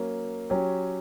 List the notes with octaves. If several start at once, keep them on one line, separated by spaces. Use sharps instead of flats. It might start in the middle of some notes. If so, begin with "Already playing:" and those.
Already playing: F#3 A#3 C#4
F#3 C#4 G4